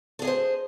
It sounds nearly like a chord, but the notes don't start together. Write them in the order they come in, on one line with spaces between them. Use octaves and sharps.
A4 G#4 D#5 C5